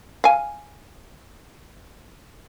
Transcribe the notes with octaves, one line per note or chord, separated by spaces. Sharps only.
F5 G#5